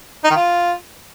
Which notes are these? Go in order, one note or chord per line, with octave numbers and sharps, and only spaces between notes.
D#4
D#3
F4